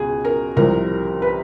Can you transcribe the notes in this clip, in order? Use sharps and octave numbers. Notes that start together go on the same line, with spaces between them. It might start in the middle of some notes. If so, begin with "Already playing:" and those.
Already playing: C#2 B2 G#4
A#4
C2 C3 F3 A#4
B4